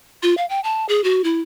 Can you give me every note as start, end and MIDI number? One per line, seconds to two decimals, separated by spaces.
0.23 0.36 65
0.37 0.46 77
0.50 0.60 79
0.64 0.86 81
0.89 1.03 68
1.04 1.24 66
1.24 1.41 64